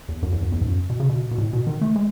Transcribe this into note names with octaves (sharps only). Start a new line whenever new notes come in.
E2
F#2
E2
F#2
E2
G#2
F#2
B2
C#3
B2
B2
A2
B2
D#3
A3
G#3